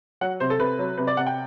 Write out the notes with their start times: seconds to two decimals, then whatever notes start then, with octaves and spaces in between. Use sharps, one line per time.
0.21 F#3 F#5
0.40 C3 C5
0.50 A4
0.59 C3 B4
0.79 F#3
0.98 C3 B4
1.07 D5
1.17 C3 F#5
1.27 G5